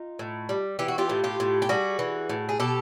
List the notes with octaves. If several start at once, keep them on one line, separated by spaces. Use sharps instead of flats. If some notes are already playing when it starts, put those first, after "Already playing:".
Already playing: D#4 F4
A2
G3
E3 G4
F#4
F4 G4
A2
F4 G4
A2
G4
G3 F#4 G#4
E3
A2
G#4
B2 G4 A4